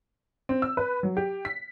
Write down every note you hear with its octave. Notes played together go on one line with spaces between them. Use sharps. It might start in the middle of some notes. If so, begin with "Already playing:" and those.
C4
E6
B4
F#3
G4
B6